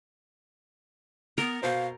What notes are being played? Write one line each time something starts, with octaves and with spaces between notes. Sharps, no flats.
B3 A#4
B2 C5 F5